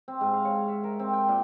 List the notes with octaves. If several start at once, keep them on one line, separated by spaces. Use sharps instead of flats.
C4
G#2
F5
C#5
E5
A#4
C4
G5
A#2